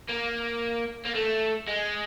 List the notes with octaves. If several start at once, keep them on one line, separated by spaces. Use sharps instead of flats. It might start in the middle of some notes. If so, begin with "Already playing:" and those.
A#3
A#3
A3
G#3